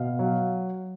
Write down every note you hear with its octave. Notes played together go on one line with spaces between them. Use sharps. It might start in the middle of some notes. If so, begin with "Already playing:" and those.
Already playing: B2 F5
F#3